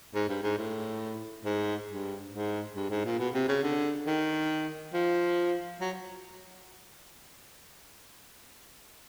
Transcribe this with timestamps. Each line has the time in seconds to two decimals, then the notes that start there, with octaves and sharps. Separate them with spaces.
0.14 G#2
0.29 G2
0.43 G#2
0.57 A2
1.45 G#2
1.89 G2
2.32 G#2
2.76 G2
2.90 G#2
3.05 A#2
3.19 B2
3.34 C3
3.48 C#3
3.63 D3
4.07 D#3
4.93 F3
5.81 F#3